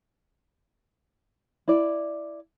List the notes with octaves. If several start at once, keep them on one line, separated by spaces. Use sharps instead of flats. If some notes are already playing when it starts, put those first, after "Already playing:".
E4 D5